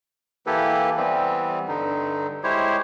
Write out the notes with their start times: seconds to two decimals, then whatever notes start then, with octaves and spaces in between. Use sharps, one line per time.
0.47 E3 A#3 E4 G4 A4 B4
0.97 E3 G3 B3 C4
1.68 G2 D3 D#4
2.44 G#3 E4 G4 C5 C#5